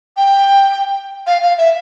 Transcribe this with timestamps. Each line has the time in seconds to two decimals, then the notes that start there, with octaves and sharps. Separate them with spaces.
0.17 G5
1.27 F5
1.43 F5
1.58 E5